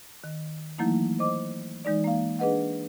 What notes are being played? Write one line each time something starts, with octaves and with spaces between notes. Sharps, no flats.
D#3
E3 F#3 A3 A#3 D#4 E4
C5 D#5 D6
E3 G#3 D#4 D5
A#3 F5
D4 G#4 B4 D#5 F#5